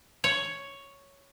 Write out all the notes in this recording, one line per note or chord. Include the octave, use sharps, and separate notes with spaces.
C#5